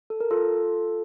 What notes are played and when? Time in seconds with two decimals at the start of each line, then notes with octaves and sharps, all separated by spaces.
0.10 A4
0.20 A#4
0.31 F4 A4